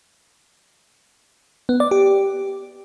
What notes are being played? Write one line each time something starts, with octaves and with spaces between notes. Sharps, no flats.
B3
D5
G4